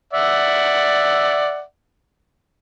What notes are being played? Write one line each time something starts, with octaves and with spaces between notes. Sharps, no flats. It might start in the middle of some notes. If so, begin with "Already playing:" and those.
D5 E5 F#5